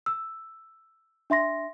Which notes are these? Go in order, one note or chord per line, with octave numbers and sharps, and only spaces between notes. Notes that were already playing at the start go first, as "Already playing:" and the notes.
E6
D4 E5 C6 A#6